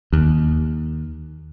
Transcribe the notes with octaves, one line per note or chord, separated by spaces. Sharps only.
D#2